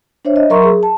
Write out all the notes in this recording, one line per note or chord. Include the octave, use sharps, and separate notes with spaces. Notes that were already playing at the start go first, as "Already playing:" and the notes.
D4 C5 C#5 E5
D#5
F#3 A#4 E5 A#5 C6 C#6
G#4
A5